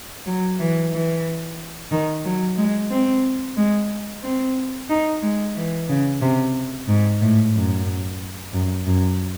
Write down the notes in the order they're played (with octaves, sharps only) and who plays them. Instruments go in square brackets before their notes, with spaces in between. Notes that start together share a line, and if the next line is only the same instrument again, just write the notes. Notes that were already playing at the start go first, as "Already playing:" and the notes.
[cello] F#3
E3
E3
D#3
F#3
G#3
C4
G#3
C4
D#4
G#3
E3
C#3
C3
G#2
A2
F#2
F#2
F#2